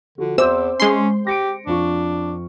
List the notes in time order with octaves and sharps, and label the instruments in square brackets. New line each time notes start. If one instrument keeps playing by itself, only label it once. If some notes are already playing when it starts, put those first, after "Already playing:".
[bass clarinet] D3 [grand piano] F3 F#4
[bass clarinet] E2 [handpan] C5 [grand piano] E5 D6 G6 [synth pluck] E6
[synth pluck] G#3 C6 [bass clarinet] C#4
[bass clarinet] G4 [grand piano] A#6 C#7 D7
[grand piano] F2 F4 C#6 [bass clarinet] D4